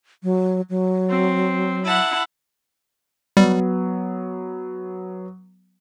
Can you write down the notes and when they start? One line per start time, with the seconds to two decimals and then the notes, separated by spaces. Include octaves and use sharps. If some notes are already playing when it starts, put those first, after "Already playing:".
0.23 F#3
0.70 F#3
1.09 C4
1.85 E4 F#5 A5
3.37 F#3 G3 B3